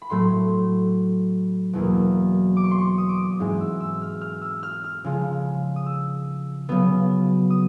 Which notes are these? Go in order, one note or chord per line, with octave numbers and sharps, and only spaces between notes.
B5
A2 F#3 A3 C6
E2 B2 F#3 A#3
D6
C#6
C6
C#6
D#6
D6
D#6
G#2 E3 G#3 C4
E6
E6
F6
F6
E6
F6
F6
C#3 F3 G#3
D#6
E6
C#3 F#3 B3
D#6